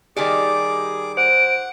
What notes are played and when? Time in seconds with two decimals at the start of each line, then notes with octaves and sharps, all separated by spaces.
0.17 D#3 G3 G4 G#4 D5 D6
1.17 C5 F#5 D7